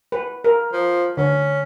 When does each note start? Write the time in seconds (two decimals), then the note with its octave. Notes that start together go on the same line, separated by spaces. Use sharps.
0.12 B4
0.44 A#4
0.73 F3
1.17 D3 C#4